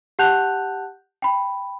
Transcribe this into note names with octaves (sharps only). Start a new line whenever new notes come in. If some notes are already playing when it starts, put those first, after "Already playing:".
G4 F#5 A5 F#6 G6 F7
G5 B5